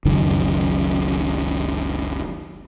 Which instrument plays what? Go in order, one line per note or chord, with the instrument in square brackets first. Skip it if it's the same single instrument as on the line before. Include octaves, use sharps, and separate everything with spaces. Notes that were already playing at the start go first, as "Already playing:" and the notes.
[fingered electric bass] F#1 C#2 F#2 D#3